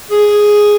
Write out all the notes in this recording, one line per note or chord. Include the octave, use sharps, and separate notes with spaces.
G#4